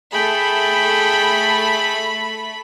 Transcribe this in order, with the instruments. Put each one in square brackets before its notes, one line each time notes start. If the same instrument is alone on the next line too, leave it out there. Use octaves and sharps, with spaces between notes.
[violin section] A3 B5 [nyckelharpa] G#4 G5